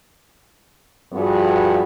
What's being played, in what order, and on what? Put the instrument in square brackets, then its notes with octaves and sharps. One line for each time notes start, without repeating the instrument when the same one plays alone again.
[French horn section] G2 F3 B3 F#4 G#4